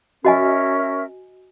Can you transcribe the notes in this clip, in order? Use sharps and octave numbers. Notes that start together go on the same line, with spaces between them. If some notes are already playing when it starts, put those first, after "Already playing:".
C#4 F#4 A#4 D#5 E5 G#5